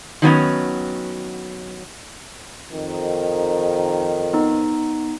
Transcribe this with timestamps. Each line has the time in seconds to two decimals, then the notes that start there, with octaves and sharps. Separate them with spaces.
0.22 D#3 F#3 B3 C#4
2.72 F2 D#3
4.33 B3 D#4